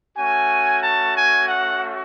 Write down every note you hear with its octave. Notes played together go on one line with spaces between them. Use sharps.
A3 C#4 F#4 G#5
A5
G#5
F#5